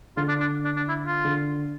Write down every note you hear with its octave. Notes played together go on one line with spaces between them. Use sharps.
D3 F4
D4
D4
D4
D4
E4
F4
D3